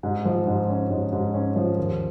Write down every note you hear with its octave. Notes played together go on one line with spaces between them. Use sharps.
G#2
F3
G#2
C#4
G#2
G#2
C#4
F3
D#2